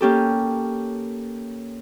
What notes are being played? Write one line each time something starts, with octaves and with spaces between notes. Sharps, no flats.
A#3 C#4 G4 A4